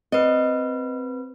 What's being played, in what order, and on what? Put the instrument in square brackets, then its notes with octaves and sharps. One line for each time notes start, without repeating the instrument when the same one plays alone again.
[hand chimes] C4 B4 [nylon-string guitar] D#5